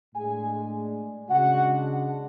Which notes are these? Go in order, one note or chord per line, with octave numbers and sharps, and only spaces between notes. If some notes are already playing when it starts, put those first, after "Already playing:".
A2 G#3 D4 G#4 G#5
C#3 G#3 D4 F#4 F#5